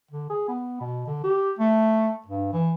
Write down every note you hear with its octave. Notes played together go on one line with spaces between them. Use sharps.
D3
G#4
B3
B2
D3
G4
A3
G2
E3